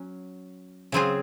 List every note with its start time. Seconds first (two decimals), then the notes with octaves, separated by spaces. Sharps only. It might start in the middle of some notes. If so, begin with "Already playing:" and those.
Already playing: F#3 C#4
0.92 C#3 F#3 C4 F4 G#4